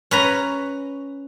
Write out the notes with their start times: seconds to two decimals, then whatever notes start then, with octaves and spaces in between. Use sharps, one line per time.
0.11 C#4 B4 A#5